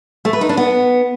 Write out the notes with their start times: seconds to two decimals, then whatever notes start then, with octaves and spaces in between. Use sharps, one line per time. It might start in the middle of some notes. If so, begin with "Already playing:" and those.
0.25 A3
0.33 B4
0.41 D#4
0.49 D4
0.57 B3